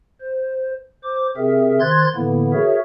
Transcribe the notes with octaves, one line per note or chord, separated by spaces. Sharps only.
C5
C5 D6
C3 C4 G#4 A#4 E5
D#3 C5 C6 F#6 G#6 A6
A2 D3 E3 A#3 B3 E4
F#4 G#4 A#4 C#5 E5